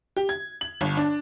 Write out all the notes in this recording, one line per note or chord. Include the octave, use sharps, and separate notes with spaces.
G4
G#6
F#7
G1
D4